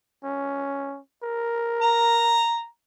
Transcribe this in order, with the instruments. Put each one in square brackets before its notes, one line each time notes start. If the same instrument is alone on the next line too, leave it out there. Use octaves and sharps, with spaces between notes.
[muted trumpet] C#4
A#4
[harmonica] A#5